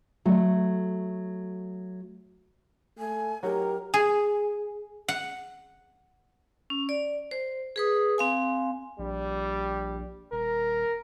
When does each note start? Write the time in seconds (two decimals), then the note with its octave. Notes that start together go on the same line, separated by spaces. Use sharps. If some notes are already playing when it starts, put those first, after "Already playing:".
0.25 F#3 A3
2.99 A3 G#5
3.43 F#3 D#4 G4 A#4
3.94 G#4
5.08 F#5
6.70 C#4
6.89 D5
7.31 C5
7.76 G#4 B4 D#6
8.18 C4 F5 G#5
8.99 A#1 G3
10.32 D#1 A#4